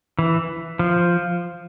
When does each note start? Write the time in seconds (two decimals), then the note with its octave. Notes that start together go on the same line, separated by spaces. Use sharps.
0.19 E3
0.79 F3